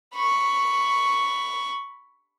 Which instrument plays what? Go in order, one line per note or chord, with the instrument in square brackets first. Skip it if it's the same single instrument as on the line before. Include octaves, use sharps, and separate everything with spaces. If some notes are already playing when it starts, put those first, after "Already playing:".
[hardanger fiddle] B5 C#6